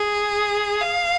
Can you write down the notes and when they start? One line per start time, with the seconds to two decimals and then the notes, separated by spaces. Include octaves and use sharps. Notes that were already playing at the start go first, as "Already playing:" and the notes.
Already playing: G#4
0.80 F5